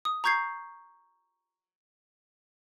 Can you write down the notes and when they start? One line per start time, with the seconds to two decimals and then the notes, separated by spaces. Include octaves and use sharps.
0.05 D#6
0.24 A#5 C#6 G6 G#6 C7